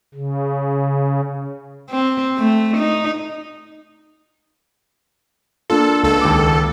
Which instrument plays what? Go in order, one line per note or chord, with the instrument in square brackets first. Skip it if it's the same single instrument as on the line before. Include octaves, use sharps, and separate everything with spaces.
[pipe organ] C#3
[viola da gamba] C4
A3
D#4
[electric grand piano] A#3 D4 F4 [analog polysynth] A4
[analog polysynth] C#2 A4
[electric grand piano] D#2 D6